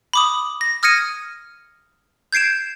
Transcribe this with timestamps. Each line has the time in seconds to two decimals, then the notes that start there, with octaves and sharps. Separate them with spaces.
0.13 B5 D6 D#6
0.61 A#6
0.83 D#6 F6 G#6 A#6 C#7 D#7
2.32 G6 G#6 C7 D7 E7